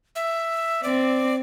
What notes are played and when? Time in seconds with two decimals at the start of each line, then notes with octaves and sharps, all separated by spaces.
0.15 E5
0.83 C4 D5